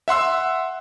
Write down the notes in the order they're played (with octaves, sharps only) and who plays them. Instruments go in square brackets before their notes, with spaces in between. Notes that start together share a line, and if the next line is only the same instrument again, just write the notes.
[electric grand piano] E5 F#5 C6 E6